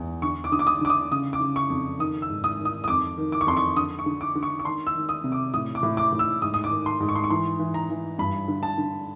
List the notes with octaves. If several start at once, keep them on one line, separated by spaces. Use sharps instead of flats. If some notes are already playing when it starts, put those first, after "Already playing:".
Already playing: E2
D3 C#6
D6
D3 D#6
D6
D#6
D3 D6
D#6
C#3 D#6
D6
C#3
C#6
F2
D#3 D#6
E6
G#2
D#6
D#3
D#6
D#6
F2 D6
D#3
D6
C#6
F2 C6
C#6
D3 D#6
C#6
D3
D6
D3
C#6
C#6
D#3 C6
E6
D#3
D#6
C3
D6
A2 D#6
D6
A2
D6
A2
E6
G#2 D#6
D#6
D6
D#3
C6
G#2
C#6
C6
C#6
E3 C6
E3
A#5
E3
G2 B5
D3
A5
D3